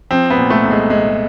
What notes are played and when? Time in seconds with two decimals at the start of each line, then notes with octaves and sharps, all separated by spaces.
0.11 F3 C4
0.30 B3
0.37 A#2
0.50 A3
0.64 C2
0.71 G#3
0.89 C2 G#3